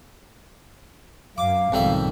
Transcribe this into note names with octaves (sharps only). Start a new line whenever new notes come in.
F#2 F5 D6
B1 F2 G#2 D#3 G3 E5